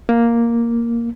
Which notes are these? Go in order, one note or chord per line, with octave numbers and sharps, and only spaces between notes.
A#3